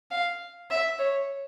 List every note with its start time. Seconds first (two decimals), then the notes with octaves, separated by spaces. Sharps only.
0.11 F5
0.70 E5
0.99 C#5